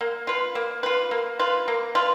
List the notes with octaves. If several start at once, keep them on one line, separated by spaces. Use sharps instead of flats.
A#3
F4 B4
A#3
F4 B4
A#3
F4 B4
A#3
F4 B4